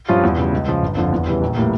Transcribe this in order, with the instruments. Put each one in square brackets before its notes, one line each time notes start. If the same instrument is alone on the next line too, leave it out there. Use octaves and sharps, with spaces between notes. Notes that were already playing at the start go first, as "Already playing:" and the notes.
[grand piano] G2 F3 C#4 F4
E2
C#3 G3
C#2
C#3 F3
G1
F2 D3 F3
E2
C#3 E3 G3
A#1
A2 E3 G3 A#3